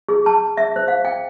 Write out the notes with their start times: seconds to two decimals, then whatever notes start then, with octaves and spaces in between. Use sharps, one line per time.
0.09 G#4
0.26 A5
0.57 E5
0.76 C5
0.88 F5
1.05 G5